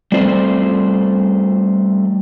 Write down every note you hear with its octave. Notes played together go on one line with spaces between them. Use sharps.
G3 A3 C4 F4 C5 D5